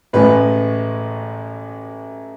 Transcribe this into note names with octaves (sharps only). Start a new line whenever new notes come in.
A1 A2 G#3 B4